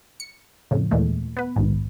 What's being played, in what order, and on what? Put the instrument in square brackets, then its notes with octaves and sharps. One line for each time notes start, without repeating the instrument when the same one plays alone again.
[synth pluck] C#7
F2 A2 C#3
D#2 A#2 E3 G#3 A3
B3 B4
A#1 D#2 G#2